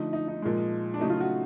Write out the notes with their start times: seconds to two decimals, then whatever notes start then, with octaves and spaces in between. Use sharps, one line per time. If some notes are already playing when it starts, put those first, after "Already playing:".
Already playing: D3 F3 A3 D#4
0.13 D#4
0.28 D#4
0.42 A#2 F3 G#3
0.94 D4
1.00 C#3 F#3 A3 D#4
1.10 F4
1.20 F#4